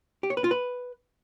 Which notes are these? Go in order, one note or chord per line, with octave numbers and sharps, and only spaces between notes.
G4
C#5
B4
F4
B4